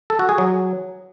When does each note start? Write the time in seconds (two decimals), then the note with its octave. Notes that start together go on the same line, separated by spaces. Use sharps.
0.10 A4
0.19 F#4
0.29 G#4
0.38 F#3